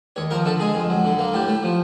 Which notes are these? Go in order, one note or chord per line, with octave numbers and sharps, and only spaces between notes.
D#2 C#5
F3 A#4
D3 A4
G#3 G#4
F2
F#3
D3
A#3
A2 G4
A3
F3